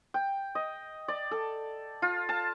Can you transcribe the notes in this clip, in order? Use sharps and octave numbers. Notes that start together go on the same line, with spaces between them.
G5
D#5
D5
A4
F4
A5